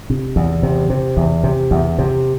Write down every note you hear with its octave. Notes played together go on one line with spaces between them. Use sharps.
C3
E2
C3
C3
E2
C3
E2
C3